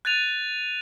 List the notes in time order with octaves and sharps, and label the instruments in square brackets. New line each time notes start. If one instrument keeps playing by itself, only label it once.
[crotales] F#6 G#6 A6 D#7 F7